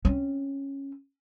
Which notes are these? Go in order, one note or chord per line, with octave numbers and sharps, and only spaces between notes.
C4 C#4